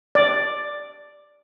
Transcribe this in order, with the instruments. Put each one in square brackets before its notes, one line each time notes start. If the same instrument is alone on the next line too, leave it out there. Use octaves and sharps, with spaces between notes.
[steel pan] D5